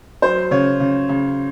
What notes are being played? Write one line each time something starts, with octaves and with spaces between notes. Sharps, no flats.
F#3 C5
C#3 C#5
C#3
C#3